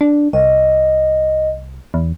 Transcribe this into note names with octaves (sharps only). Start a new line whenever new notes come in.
D4
C2 D#5
E2